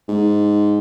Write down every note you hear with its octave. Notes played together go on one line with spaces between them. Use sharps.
G#2